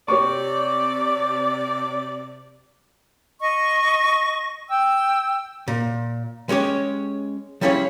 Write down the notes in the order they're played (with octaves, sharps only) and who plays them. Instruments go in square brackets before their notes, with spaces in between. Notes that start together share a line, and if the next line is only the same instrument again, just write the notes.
[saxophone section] C3 D5 [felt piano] G4 C#5 C#6
[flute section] D#5 C#6
G5 E6
[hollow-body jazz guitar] A#2
G#3 C#4 G4 C#5
F3 G3 C#4 E4 G#4 C#5